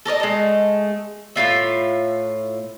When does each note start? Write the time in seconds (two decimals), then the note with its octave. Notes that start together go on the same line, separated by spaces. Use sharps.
0.05 A4 A#4 D5 D#5
0.20 G#3 A3
1.36 A2 G3 F4 E5